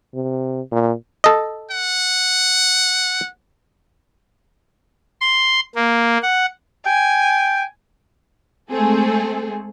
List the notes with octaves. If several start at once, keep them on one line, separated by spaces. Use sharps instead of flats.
C3
A#2
A4 D#5
F#5
C6
A#3
F#5
G5 G#5
G#3 A3 C4 G#4 A4